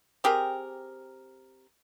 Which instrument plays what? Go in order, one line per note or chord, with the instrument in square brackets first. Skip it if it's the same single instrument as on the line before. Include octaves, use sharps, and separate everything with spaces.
[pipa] C4 G4 G#4 A#4